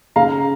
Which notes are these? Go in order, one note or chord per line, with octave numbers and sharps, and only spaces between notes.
C#3 F5 A#5